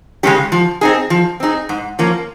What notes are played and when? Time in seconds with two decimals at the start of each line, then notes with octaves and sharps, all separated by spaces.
0.23 C#3 G#3 C#4 G4
0.52 F3
0.81 C4 D#4 G#4
1.10 F3
1.40 C4 D#4 G#4
1.69 G#2
1.99 F3 A#3 C#4